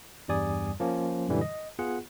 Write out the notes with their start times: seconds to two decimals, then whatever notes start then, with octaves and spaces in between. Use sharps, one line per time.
0.28 E2 G2 G3 D5 G#5 D#6
0.80 F3 A#3 C#4
1.28 F#2 A#2 D3 E3 G3
1.41 D#5
1.79 B3 F4 G#4 F#5